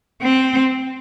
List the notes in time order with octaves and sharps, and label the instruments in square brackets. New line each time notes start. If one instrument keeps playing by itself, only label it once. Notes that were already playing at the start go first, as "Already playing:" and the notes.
[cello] C4